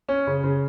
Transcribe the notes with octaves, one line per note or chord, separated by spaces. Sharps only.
C#4
C#3
C#3